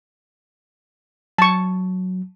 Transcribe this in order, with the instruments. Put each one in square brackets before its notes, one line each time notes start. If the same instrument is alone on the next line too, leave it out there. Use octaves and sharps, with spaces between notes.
[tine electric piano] F#3 [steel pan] A5 C#6